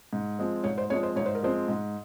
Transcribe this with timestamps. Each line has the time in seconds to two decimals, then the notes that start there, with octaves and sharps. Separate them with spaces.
0.13 G#2
0.39 F3 G#3 C4
0.64 G#2 C#5
0.78 C5
0.90 F3 G#3 C4 C#5
1.03 C5
1.16 G#2 C#5
1.26 C5
1.35 A#4
1.43 F3 G#3 C4 C5
1.68 G#2